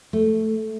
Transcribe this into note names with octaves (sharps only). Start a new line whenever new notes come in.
A3